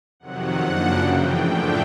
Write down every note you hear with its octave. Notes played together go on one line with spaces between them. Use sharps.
F2 C3 D#3 F#3 F#5
F#2 C#3 F3 A#3 D4
F#2 C#3 E3 G5
A2 F3 A3 D4 G5